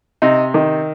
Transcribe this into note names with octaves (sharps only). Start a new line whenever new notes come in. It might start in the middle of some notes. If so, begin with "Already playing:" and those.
C3 D#4
D#3